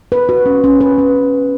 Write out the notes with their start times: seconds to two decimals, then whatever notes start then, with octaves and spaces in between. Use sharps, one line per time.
0.12 B4
0.29 F#4
0.46 C#4
0.64 C#4
0.81 B4
0.98 C#4